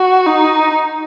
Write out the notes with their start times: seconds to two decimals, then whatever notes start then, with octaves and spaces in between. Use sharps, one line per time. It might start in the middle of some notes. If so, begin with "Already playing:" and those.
Already playing: F#4
0.26 D#4